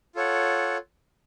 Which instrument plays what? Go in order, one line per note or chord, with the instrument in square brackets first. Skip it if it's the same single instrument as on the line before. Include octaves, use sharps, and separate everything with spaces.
[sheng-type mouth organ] F4 A4 C#5 F#5